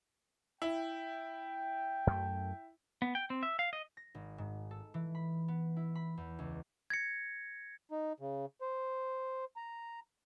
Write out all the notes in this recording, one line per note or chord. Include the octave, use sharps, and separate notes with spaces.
E4 G5
F#2 A3
B3
G5
C4
E5
F5
D#5
A#6
G#1
G#2
A4
E3
B5
B3
E4
B5
E2
C#2
G#6 A#6 C#7
D#4
C#3
C5
A#5